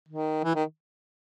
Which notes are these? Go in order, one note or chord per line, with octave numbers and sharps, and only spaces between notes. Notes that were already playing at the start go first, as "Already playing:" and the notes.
D#3
E3
D#3